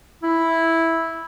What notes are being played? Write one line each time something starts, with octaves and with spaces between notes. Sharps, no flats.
E4